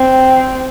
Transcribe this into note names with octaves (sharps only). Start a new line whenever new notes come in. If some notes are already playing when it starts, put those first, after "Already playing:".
Already playing: C4